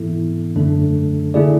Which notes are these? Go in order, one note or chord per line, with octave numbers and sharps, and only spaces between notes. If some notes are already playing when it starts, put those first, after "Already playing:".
Already playing: G#2 E3 B3 E4 A4
F#2 D3 A3 D4 A4
D3 A3 E4 G#4 D5